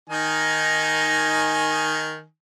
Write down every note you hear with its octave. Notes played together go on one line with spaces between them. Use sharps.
D#3 D#4 G#5